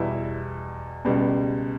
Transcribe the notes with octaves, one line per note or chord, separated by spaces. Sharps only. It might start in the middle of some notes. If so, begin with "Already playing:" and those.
Already playing: E2 B2 G3 E4 E5
C#2 B2 G3